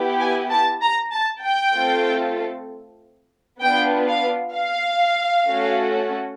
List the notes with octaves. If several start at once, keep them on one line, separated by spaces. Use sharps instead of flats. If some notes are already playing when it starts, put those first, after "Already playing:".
Already playing: B3 E4 G4
G#5
A5
A#5
A5
G5
A3 C4 F4 A4
B3 D4 F4 G5
F5
F5
A3 C#4 F#4 A4